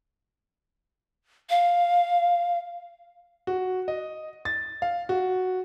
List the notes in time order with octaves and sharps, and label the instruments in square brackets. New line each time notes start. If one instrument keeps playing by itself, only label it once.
[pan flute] F5
[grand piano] F#4
D#5
A6
F5
F#4